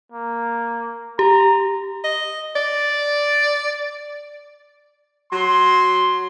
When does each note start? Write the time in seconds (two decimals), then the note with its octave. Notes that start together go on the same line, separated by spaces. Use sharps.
0.12 A#3
1.19 G4 A#5
2.04 D#5
2.55 D5
5.32 F#3 C6